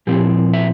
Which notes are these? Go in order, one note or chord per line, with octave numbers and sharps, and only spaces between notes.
A#2 F3 C4 E4 G4
E5